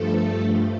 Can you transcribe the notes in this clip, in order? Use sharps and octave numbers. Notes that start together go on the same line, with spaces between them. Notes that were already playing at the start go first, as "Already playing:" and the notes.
Already playing: G2 F3 A3 A4